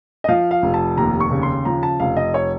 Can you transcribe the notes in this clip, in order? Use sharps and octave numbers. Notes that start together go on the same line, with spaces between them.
D#5
F3 F5
F5
F1
A5
D#2 A#5
C#6
C#3
C6
F3 A#5
A5
F1 F5
D#5
C#5